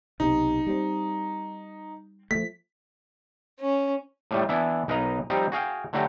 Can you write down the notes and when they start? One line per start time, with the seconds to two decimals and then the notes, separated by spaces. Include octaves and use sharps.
0.20 B1 C3 D#4
0.67 G3 C4
2.31 F3 A3 B6
3.60 C#4
4.31 A2 G3 A3
4.49 E3 B3 D4 E4
4.88 B1 D#4 A#4 B4 D#5 A#5
5.30 F3 G3 C4 D#4 G4
5.52 F#4 G#4 F5 G5
5.93 D3 F#3 A3 F#4 G4